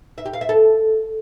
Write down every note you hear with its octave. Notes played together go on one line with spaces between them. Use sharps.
E5
G4
F5
E5
A4